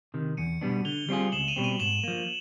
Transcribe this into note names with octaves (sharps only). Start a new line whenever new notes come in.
C3 D#3
E2 C#7 D#7
B2 G3 B3 D4
D3 F7 G7
G3 C4 F4 G#4
C#2 E7 F#7
D#7 F7
B2 G3 C4
D#7 F7
G#2 E7 F#7
F3 A#3